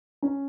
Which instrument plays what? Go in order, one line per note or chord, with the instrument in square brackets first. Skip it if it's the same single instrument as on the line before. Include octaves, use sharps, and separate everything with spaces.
[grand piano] C#4